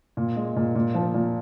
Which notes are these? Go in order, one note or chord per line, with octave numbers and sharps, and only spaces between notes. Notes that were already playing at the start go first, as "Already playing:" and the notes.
A#2
G#3
A#2
A#2
F3
A#2